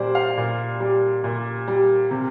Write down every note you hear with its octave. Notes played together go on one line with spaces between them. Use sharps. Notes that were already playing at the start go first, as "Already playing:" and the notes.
Already playing: A#2 G3 C5 D5
F5
A#2
G3
A#2
G3
C3